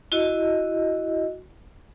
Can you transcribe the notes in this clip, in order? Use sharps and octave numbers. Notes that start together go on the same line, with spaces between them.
E4 F#4 D#5